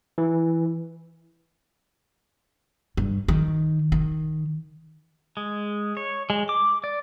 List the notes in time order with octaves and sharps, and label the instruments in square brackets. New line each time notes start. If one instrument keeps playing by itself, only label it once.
[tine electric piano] E3
[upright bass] G2
D#3
D#3
[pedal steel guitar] G#3
C#5
G#3
D6
D5